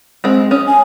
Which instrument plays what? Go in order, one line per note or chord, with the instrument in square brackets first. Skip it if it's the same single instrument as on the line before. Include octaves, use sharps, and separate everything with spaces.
[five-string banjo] G#3 C4
[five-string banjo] C#4 [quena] D#6
[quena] G#5